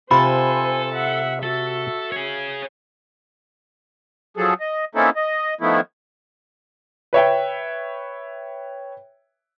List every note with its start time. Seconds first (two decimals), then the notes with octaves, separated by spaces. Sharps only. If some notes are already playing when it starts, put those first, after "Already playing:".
0.11 C3 F4 A4 C5 G#5 B5
0.93 E5 F#5
1.43 F#4 A4 E5
2.12 G#4 C#5
4.37 F3 F#3 G#4 A4
4.60 D#5
4.95 A#3 C4 C#4 D#4 E4 A4
5.16 D#5
5.61 D#3 F3 A3 B3 E4
7.13 B4 C#5 E5 G5